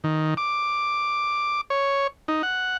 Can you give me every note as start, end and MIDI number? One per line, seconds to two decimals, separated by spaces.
0.04 0.34 51
0.37 1.61 86
1.70 2.07 73
2.28 2.42 63
2.43 2.77 78